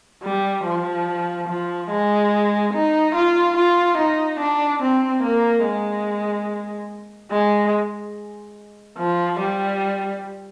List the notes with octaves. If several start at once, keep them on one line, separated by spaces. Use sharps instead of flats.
G3
F3
F3
G#3
D#4
F4
F4
D#4
D4
C4
A#3
G#3
G#3
F3
G3